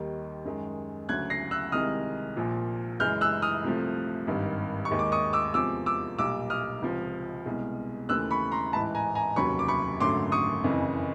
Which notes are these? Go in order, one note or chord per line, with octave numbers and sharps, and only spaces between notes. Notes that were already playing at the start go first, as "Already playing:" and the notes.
Already playing: D#2 D#3 G3
F#2 D#3 G#3
D2 C#3 F#3 F#6 G#6
A#6 C7
E6 F#6
C2 C3 D#3 G#3 D#6 F6
A#1 A#2 F3
F#2 C#3 E3 G#3 F6 G6
E6 F#6
D#6 F6
C2 C3 F3 A3
G#1 G2 D#3 G3
C#6
D#2 D#3 G#3
D6
C#6 D#6
D6 E6
E2 C3 F3 G#3 D6 E6
D6 E6
B1 A#2 G3 D6 E6
D#6 F6
C#2 C3 F3
C2 B2 G#3
D#2 C#3 E3 A3 E6 F#6
B5 C#6
A#5 C6
A1 G#2 E3 A5 B5
G#5 A#5
G#5 A#5
F1 D#2 C#3 F#3 B5 C#6
D6
B5 C#6
G#1 F#2 D3 F#3 A3 C6 D6
C#6 D#6
F#1 F2 C#3 E3